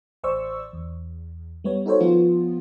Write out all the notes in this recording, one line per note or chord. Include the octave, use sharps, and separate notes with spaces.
A1 C5 D5 C#6 E6
E2
G3 B3 C#5
D#4 F#4 A4 C5 C#5
F3 B3 F4